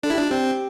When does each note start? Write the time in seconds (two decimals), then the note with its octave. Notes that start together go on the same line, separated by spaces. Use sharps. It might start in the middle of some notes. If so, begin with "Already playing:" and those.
0.03 D4 A4
0.10 E4 G4
0.19 D4 F4
0.28 C4 G4